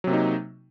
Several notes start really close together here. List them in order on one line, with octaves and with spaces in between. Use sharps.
F#3 C3 A#3 D#4